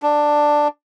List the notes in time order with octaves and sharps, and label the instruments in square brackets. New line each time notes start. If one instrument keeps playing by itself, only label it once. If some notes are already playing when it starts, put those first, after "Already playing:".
[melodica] D4